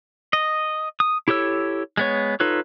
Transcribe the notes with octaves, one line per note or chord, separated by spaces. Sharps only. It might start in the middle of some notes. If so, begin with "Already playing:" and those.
D#5
D#6
E4 G4 A4 C#5 E6
G#3 B3 C#5
D#4 F4 A4 B4 C#5